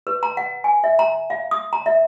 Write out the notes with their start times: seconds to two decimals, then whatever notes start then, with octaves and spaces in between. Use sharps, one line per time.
0.07 B4
0.23 A#5
0.37 F#5
0.64 G#5
0.84 E5
0.99 A#5
1.30 F5
1.51 D#6
1.73 A#5
1.86 E5